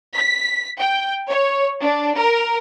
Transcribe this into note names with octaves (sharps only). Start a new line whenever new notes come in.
B6
G5
C#5
D4
A#4